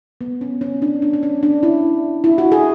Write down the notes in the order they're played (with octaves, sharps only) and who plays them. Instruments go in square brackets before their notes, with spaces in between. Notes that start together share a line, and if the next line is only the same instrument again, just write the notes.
[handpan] B3
C#4
C#4
D4
D4
D4
C#4
D4
E4
E4
F#4
G#4